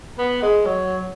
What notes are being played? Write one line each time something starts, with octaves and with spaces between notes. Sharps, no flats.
B3
G#3
F#3